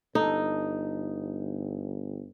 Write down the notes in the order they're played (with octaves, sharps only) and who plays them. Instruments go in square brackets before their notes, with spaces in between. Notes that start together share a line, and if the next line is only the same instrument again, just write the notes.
[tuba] G1 [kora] D#4 [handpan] A4